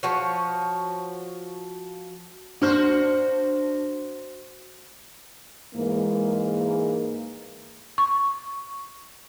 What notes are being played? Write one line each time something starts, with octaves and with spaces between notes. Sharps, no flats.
F3 F#4 C#5
D4 F#4 C5 F6
G#2 E3 G#3 A#3
C#6